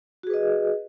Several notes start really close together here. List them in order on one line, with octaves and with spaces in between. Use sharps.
F#4 G#4 B4 D#5